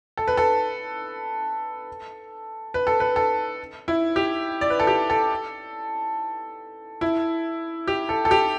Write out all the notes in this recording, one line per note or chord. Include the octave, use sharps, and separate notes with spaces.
A4
B4
A4
B4
A4
B4
A4
E4
G4
D5
B4
A4
G4
A4
E4
G4
A4
A4
G4